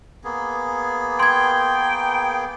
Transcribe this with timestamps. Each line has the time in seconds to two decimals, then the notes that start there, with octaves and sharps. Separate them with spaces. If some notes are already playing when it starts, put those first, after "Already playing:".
0.24 A#3 B3 G#4
1.20 G5 C6 G#6